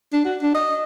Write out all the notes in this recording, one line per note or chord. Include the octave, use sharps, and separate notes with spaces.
D4
F#4
D4
D#5